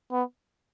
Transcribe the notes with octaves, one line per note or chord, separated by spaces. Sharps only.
B3